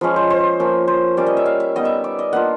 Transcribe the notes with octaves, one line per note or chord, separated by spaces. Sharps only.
F3 G#3 C#4 B4
C5
C5
F3 A#3 C#4
C5
G3 A#3 C#4 D5
D#5
E5
F5
E5
G3 B3 D#4 D#5
E5
D5
D#5
A#3 D4 F4 F#5